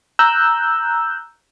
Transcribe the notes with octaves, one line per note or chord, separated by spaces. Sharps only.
A#5 E6 F#6 G6